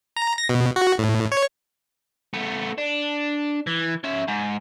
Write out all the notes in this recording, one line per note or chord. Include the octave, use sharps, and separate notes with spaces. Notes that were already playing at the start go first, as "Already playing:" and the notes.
A#5
A#6
B2
F#4
A2
C#5
A3 B3
D4
E3
C#4 E5
G#2